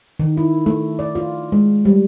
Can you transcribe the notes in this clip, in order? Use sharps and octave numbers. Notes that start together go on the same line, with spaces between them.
D#3
E4
A3
D5
F4
G#3
G3